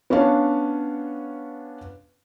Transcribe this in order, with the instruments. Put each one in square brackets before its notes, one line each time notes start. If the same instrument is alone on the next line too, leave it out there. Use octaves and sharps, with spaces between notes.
[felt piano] B3 C#4 D4 C#5 F5